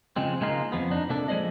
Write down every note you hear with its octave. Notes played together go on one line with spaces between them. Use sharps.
C#3 F3 G#3 C4
C#3 G#3 A#3 D#4 F4
F2 F3 B3
D4 D#4
C3 A#3 D4 A4
F3 G#3 C4 C5 D5 D#5